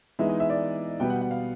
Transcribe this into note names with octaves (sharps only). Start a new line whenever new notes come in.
E3 G#3 B3 D#4 E5
D#5
E5
D5
B2 G3 B3 G5
F#5
F#5
F5